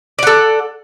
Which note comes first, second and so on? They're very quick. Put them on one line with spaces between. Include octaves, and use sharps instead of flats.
D5 F#5 A4